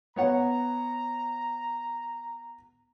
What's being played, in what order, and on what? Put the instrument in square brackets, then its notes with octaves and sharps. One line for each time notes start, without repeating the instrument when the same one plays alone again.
[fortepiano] B3 C#5 F#5 [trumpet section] A#5